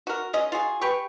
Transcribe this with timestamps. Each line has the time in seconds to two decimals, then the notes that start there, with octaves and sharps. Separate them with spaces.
0.07 F#4 A#4
0.33 G#3 C#4 D#5
0.52 F4 F#4 G#4
0.81 G4 B4 G5 C#6